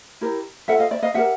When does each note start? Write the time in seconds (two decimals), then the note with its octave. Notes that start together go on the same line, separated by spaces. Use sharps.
0.21 E4 G4 A#4
0.68 F4 A4 E5 F#5
0.79 D#5 F5
0.91 D5 E5
1.03 D#5 F5
1.14 E4 G4 A#4 E5 F#5